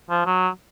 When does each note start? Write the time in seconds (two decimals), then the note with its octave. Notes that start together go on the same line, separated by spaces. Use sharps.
0.10 F3
0.26 F#3